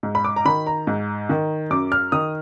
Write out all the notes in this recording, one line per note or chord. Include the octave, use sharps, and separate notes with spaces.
G#2
B5
D6
A#5
D#3 B5
A#5
G#2
D#3
F#2 D6
F6
D#3 D#6